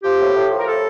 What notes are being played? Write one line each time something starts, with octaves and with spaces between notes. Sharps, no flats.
F3 G4
A2
A2
F3
A#4
A2 A4